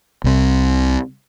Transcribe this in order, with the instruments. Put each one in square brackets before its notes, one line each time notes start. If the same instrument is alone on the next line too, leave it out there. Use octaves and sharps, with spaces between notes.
[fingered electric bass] C2 C3